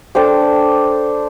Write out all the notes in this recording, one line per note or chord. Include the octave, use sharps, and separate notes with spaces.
D4 A4 C5 G5